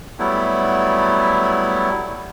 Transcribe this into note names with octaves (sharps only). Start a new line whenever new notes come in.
F#3 G3 A3 B3 E4